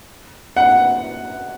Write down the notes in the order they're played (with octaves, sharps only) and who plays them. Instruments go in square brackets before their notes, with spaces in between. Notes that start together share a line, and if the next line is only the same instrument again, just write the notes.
[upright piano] F#5